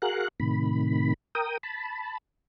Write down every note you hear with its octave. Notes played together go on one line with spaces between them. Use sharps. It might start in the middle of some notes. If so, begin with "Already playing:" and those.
F#4 G#4 A#4 F5 F#5 F#6
A2 C3 D#3 B5
A#4 G5 D#6
A5 B5